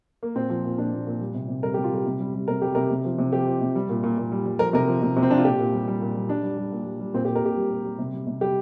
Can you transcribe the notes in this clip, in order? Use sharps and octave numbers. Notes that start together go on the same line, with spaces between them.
A#3
A#2 C4
F3
A#2
A#2 D4
A#2
A#2
G3
C3
C3
G3 A#4
C3 G4
F4
G3 G4
C3
G3
G3
C3 A#4
G3 G4
C3 A#4
C3
F3
C3
F3 G4
F3
C3
G3
A#2
A#2
A#2
G3
G3
F3 A#4
C3 A#4
F3
C3
C3
C4
F3 D4
F4
A#2 G4
A#2
G3
G3
A#2
G3
G3 D4
G3
G3
A#2
G3
G3
A#2 C4
G4
A#2
A#4
A#2 G4
G3
A#2
G3
C3
G3
C3
G3 G4